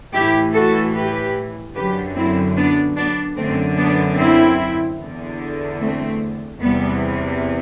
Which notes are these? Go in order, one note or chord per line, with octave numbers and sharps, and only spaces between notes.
A2 E3 E4 G4
F#4 A4
G4 B4
F#2 D3 G4 B4
C4 E4
B3 D4
B3 D4
F#2 D3 A3 C4
B3 D4
C4 E4
E2 D3
A3 C4
E2 C3 E3 G3 B3